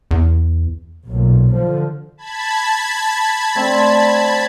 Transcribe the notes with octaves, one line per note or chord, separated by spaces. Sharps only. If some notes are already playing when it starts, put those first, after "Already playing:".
E2
B1 A#2
D3 F3
A5 B5 G#6
A3 C4 D4